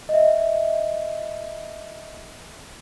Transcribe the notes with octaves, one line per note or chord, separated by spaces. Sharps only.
D#5 E5